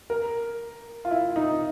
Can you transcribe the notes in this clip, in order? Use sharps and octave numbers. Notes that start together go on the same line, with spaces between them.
A#4
F4
E4
D#4